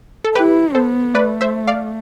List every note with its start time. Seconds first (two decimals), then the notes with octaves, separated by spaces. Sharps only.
0.24 A4
0.35 E4 G4 B4
0.75 B3 A4 C5
1.15 A3 B4 D5
1.41 C5 E5
1.67 D5 F5